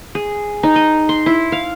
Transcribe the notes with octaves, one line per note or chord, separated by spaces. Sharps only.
G#4
D#4
D#5
C6
E4
F5